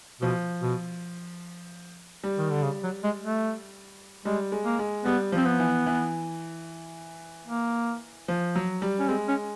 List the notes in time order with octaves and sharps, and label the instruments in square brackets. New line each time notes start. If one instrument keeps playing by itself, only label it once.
[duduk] B2 [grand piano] F3
[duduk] B2
[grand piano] G3
[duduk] D#3
D3
C#3
F#3
G#3
A3
[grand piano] G3 [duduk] G#3
[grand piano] G#3
[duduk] A#3
[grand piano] G#3
[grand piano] G3 [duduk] B3
[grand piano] F3 [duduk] C4
[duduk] B3
[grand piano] E3
E3
[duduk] A#3
[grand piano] F3
F#3
G3
[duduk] C#4
[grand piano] G#3 [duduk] C4
[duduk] C#4